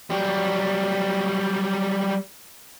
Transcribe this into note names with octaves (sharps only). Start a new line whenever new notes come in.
F#3 G3